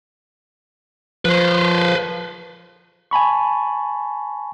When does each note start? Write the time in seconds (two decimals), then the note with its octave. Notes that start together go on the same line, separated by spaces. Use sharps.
1.25 F3 B4 C5
3.11 G#5 A5 B5 C#6